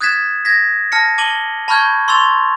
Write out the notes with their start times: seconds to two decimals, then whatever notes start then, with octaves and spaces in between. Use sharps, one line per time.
0.01 D#6 F#6 G#6 A6 B6 E7
0.45 G#6 A#6 B6
0.92 A5 F6 A#6 C#7
1.18 A5 D6 D#7 F#7 G7
1.68 A5 B5 C#6 F6 G6 G#6
2.08 C6 C#6 E6 A6 F7